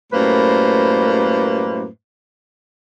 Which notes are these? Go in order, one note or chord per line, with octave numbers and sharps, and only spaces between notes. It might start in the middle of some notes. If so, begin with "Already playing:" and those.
F#2 A2 G3 A#3 B4 C5